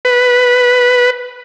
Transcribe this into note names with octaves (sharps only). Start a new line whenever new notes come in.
B4